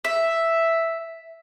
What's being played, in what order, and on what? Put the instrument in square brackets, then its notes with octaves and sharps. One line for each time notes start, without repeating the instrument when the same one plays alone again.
[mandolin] E5